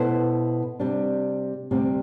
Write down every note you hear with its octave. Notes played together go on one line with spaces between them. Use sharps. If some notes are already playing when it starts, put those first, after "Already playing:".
Already playing: B2 B3 E4 A4 C5
C3 G3 D4
D2 C3 G3 C4